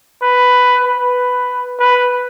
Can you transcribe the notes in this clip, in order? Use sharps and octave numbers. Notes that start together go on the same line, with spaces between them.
B4
B4
B4